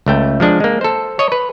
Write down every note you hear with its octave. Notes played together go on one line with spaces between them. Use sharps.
C#2 A3 G5
F3 G#3 D4
G#3 A#3
A4 C5
C#5 D#5
B4